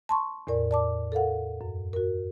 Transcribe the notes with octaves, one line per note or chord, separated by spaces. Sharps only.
A5 C6 C#6
E2 A2 A#4 D5
D5 A5 D6
A4 A#4 F5 F#5
F#2
F#4 A#4